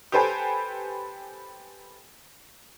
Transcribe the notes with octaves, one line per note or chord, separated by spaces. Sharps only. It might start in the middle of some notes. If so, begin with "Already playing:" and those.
G4 A4 B4 C5 G5 G#5